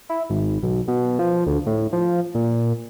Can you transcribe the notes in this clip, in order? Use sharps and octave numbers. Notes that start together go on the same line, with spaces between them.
E4
G#1
B1
B2
F3
D2
A2
F3
A#2